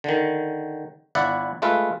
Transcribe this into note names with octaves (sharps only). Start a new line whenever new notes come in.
D3 D#3
G1 E4 D5 E5 F#5
G#3 A3 F4 B4 E5